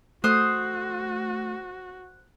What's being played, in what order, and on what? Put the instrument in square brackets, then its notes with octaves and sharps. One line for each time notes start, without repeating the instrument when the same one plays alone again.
[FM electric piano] A3 [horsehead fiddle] F#4 [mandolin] C5 D#6 [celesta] F#6